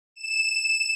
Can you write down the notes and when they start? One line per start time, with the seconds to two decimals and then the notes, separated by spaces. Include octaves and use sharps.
0.16 E7